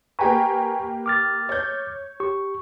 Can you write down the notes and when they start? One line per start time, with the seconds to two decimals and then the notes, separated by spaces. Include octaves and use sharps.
0.19 A#3 G4 B4 G#5 A#5 C#6
1.06 D6 F6 A6
1.49 C#5 G6
2.20 G4 C#6